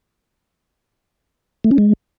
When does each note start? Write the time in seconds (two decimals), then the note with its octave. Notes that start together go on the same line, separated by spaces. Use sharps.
1.64 A3
1.71 C#4
1.78 G#3